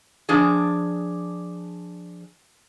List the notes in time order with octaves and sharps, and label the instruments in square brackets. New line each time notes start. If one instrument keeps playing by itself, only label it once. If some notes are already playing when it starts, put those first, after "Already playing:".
[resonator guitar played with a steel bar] F3 D4 G#4